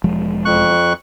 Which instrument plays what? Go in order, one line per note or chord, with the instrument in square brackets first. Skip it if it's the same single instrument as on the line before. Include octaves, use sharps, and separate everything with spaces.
[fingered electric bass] E1 F3 G#3
[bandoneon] F2 C#6 F#6